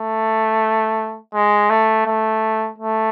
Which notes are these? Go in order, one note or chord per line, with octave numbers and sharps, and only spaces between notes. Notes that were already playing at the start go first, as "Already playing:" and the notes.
Already playing: A3
G#3
A3
A3
A3